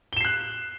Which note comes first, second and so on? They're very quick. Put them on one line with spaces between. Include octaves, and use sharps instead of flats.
G7 E7 C7 F#6